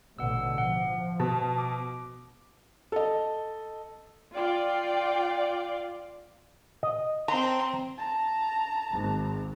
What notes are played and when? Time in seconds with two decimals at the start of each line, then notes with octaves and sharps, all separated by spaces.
0.19 A1 B2 D3 F#5 E6
0.58 F3 F#5
1.20 B2 A5
1.58 D6
2.92 A4 D#5
4.36 F4 D5 G5
6.83 D#5
7.28 C4 A#5 C6
7.98 A5 A#5
8.91 G#1